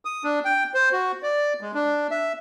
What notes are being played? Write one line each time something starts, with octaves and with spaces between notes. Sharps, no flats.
D#6
D4
G5
C5
F#4
D5
G#3
D4
E5